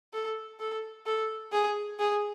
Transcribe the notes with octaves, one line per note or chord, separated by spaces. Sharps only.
A4
A4
A4
G#4
G#4